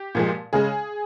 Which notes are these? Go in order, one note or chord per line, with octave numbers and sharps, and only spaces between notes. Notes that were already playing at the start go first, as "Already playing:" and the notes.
Already playing: G4
A#2 F3 G#3
C#3 G#3 G#4